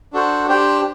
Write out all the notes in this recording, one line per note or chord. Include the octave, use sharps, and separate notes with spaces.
D4 F#4 A4 C5
D4 G4 C5 G5